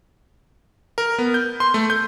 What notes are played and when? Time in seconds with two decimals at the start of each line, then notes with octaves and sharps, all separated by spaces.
0.98 A#4
1.18 B3
1.34 G6
1.60 C6
1.74 A3
1.90 G6